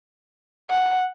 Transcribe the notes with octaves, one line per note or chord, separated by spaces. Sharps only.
F#5